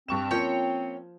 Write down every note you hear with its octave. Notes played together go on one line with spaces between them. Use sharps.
G2 C4 C#6 E7
F3 A#3 C#4 C#5 G5